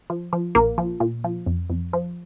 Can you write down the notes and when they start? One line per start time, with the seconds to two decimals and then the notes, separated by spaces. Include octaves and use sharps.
0.10 F3
0.33 F3
0.55 A#1 A#3
0.78 F3
1.00 A#2
1.24 F3
1.46 F2
1.70 F2
1.93 F3